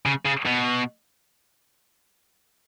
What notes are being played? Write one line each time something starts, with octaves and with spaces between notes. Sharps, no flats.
C#3
C#3
B2